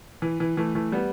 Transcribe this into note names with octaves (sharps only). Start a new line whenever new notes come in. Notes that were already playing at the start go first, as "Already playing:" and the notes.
E3
E3
E3 A3
E3 A3
G3 B3